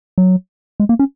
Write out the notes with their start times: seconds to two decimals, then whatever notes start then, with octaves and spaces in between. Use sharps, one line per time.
0.18 F#3
0.80 G#3
0.89 A#3
0.99 C#4